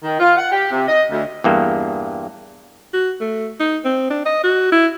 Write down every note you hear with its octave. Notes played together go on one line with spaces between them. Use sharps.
D#3
F4
F#5
G4
C3
D#5
D2
E2 G2 A#3
F#4
A3
D#4
C4
D4
D#5
F#4
E4